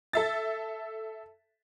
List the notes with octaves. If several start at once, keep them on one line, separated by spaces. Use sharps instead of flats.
A4 E5 A6